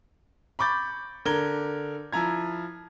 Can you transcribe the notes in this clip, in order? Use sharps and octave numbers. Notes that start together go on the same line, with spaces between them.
B5 C#6 D6 G6 A6
D3 A#4 G#6 G7
F3 E4 A#5 G#6